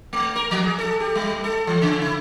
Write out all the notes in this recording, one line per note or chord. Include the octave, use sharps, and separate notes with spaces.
A3
A#4
F3
G#4
A4
G4
G3
A4
E3
C#3
E4